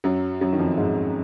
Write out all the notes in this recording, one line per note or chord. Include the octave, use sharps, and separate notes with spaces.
F#2 F#3
F#2 F#3
D#3
F2 F3
G#2 G#3